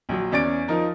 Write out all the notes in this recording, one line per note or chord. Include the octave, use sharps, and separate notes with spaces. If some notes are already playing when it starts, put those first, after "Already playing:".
A#1 F#3
E2 C#4 D5 A6 D7
F3 D#4 A#4